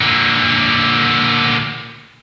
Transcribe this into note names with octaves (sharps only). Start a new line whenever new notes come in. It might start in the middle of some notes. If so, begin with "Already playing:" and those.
A#2 D3